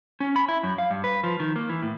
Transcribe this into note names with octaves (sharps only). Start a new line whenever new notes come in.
C#4
B5
E4
F#2
F5
G2
B4
F3
D#3
A#3
E3
A2